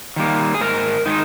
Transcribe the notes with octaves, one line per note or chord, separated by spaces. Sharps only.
D#3 G3 A#3
G#4
G#2 A#4
D#3 G#3 D#4